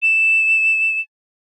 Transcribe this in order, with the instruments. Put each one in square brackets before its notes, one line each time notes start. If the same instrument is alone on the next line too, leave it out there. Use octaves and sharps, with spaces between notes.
[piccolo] E7